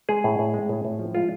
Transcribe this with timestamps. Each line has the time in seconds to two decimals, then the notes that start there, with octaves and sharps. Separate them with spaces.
0.09 G#3 G#4
0.24 A2
0.39 A2
0.54 G#3
0.69 A2
0.85 A2
0.99 F3
1.15 G#3 F4